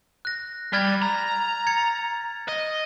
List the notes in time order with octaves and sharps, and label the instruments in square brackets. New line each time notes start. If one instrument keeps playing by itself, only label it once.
[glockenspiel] F#6 A#6
[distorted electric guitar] G3 [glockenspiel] F6 G#6 A6
[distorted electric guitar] A#5
[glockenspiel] G#6 A6 C#7
[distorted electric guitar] D#5